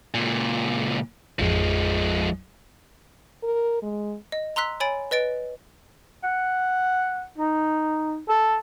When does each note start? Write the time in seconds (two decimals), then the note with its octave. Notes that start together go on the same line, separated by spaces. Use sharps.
0.14 C#2 A#2
1.39 A1 F2 F3 G#3
3.43 A#4
3.82 G#3
4.32 D#5
4.56 A#5 C6 E6 F#6 B6
4.80 C#5 G#5 B5 A6 D7
5.11 B4 D#5 A6 D7
6.24 F#5
7.38 D#4
8.29 A4